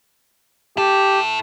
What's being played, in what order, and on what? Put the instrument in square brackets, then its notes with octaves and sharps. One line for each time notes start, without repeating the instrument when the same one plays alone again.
[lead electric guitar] E4 A4 [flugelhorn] G4